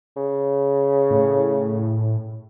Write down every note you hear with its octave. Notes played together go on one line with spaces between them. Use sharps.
C#3
A2